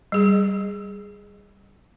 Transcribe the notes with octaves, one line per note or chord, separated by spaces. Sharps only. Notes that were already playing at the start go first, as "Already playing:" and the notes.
G3 G#4